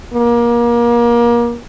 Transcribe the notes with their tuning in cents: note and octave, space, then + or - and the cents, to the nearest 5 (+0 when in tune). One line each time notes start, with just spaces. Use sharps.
A#3 +30